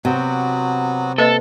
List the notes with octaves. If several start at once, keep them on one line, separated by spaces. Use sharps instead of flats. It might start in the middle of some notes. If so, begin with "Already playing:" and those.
C3 F#3 B3 F#4
A#3 A4 B4 D#5